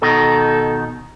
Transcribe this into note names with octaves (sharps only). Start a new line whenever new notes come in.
B2 D#3 D#4 A4